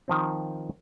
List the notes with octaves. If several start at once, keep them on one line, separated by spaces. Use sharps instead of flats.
D#3 F3 C4